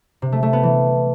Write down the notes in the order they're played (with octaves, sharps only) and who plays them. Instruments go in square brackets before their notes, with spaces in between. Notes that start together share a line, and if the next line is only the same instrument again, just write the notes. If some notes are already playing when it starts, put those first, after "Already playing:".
[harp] C3
A3
A3
B3
E3